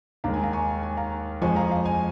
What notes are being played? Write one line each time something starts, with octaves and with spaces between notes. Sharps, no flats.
D#2 D#3 G#3 F5 A#5
G#5
F5 A#5
G#5 C#6
G#5
F5 A#5
F2 F3 G#3 G#5 C#6
F5 A#5
F5
G#5